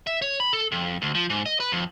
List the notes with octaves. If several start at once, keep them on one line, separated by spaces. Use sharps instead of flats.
E5
C#5
B5
A4
F2
D2
F3
G#2
D#5
B4
F2